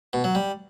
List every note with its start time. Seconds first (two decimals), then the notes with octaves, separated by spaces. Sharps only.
0.13 B2
0.24 F#3
0.35 G3